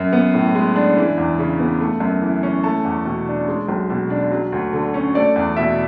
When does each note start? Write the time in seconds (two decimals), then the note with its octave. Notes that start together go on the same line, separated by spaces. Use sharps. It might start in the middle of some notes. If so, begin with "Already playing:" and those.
Already playing: F#2
0.13 B3
0.34 A2
0.55 G#3
0.76 D4
0.97 E3
1.18 E2
1.38 C#3
1.60 B3
1.80 A3
2.00 F#2
2.22 E3
2.43 C#4
2.64 A3 A5
2.85 E2
3.05 B2
3.27 D4
3.48 G#3
3.69 B1
3.90 B2
4.10 D4
4.31 F#3
4.52 D2
4.73 D3
4.94 C#4
5.15 A3 D5
5.36 E2
5.57 B2 E5